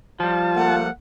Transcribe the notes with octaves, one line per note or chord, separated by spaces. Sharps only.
F3 G3 F4 A5
A3 A#3 F#5